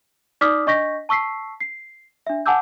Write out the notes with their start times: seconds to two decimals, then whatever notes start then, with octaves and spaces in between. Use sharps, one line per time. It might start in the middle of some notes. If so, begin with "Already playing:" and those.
0.41 D#4 D5 D6 D#6 F6 B6
0.67 D4 D#5 C#6 G6 A#6 B6
1.09 A5 C#6 E6 B6 C7
1.61 C7
2.27 D4 E5
2.46 F#5 G#5 A5 D6 E6 G6